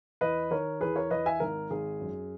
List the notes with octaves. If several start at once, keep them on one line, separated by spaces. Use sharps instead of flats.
E2 B4 D#5
D#3 A#4 C#5
E2 G#4 B4
A#4 C#5
E2 B4 D#5
E5 G#5
G#1 A#4
G#1 G#4
F#2